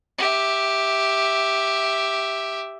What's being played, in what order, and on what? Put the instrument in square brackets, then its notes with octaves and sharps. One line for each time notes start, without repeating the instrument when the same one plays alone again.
[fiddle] G4 E5